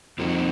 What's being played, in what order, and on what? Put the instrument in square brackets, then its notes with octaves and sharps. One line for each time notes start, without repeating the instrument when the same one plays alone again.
[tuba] F2 [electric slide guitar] F3 A#3 D#4 F#4